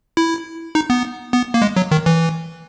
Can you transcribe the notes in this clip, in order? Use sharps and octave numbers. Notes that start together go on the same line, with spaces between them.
E4
D#4
B3
B3
A#3
G#3
F#3
D#3
E3